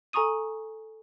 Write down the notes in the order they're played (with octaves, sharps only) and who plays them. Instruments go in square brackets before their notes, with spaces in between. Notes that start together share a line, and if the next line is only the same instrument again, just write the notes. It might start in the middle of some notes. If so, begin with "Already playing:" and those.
[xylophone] A4 G#5 A#5 C#6 D#6 D#7